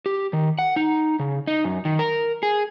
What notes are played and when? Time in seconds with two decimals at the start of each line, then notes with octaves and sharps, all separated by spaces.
0.06 G4
0.33 D#3
0.59 F#5
0.76 D#4
1.20 C#3
1.47 D#4
1.64 F#2
1.85 D#3
1.99 A#4
2.43 G#4